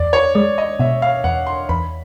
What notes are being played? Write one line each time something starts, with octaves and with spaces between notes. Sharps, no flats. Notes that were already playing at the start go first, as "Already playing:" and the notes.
Already playing: E2 D5
C#5
G#3 D5
D#5
B2 E5
F5
E2 F#5
C6
E2 B5